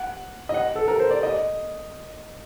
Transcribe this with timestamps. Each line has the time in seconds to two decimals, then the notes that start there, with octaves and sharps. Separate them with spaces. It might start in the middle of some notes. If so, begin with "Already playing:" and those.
Already playing: F#5
0.49 D#5
0.54 F#5
0.75 A4
0.88 A#4
1.00 C5
1.11 D5
1.23 D#5